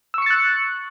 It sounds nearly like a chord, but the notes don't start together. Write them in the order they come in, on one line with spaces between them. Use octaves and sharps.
E6 C#6 C#7 A6 F#6